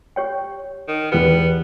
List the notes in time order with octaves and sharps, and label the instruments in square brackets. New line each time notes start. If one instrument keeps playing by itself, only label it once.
[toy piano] G4 C#5 G5
[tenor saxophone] D#3
[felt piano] E2 G4 [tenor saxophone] B3 [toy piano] B4 G5